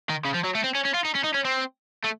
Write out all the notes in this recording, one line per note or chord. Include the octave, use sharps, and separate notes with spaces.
D#3
C#3
F3
F#3
A3
C4
C#4
C#4
F4
D#4
C#4
D#4
C#4
C4
A3